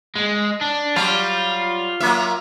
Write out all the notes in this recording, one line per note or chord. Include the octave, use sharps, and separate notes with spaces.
G#3
D4
F#3 G3 F4
F#3 A#3 E5